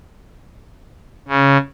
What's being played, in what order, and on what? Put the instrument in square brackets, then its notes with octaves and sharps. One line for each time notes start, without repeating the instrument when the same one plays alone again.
[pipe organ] C#3